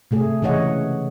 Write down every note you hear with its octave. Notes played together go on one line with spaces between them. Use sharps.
C3 A3 G#4
C#3 E3 G#4 C#5 D#5 F#5